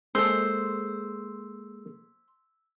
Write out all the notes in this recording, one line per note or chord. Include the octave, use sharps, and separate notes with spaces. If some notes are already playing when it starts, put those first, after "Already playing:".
G#3 A#3 A4 C5 E6